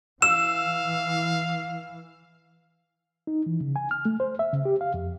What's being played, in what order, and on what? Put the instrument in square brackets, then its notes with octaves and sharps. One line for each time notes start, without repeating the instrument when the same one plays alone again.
[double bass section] E3 [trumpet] F5 [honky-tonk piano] E6 [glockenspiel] E7
[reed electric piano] D#4
E3
C#3
G#5
F6
A3
C5
E5
C#3
G4
F5
F2